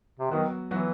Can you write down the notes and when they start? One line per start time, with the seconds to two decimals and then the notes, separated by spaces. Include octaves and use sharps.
0.19 C3
0.31 D#3 F#3 B3 F#4
0.70 E3 F#3 B3 F#4